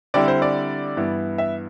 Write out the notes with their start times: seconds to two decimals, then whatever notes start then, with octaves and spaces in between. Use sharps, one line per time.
0.14 D3 G3 C4 E4 D5
0.28 C5
0.42 D5
0.97 G2 E3 B3 E4
1.38 E5